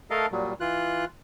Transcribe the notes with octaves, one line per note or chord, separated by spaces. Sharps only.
A3 A4 A#4 D#5 F5
A#2 F#3 G3
E3 F4 F#6